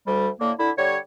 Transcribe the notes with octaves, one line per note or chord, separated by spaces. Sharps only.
D2 G3
A2 D3 A#3
D3 E4
D3 G3 C#5